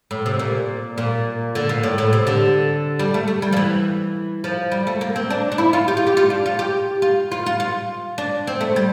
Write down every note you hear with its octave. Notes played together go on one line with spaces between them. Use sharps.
A2
C3
A#2
A#2
D3
A#2
A2
A2
C3
D3
G3
A3
A3
G3
F3
E3
F3
G3
A3
A#3
C4
D4
D4
E4
F4
G4
F4
G4
F4
D4
F4
G4
F4
F4
F4
F4
D4
C4
A3
G3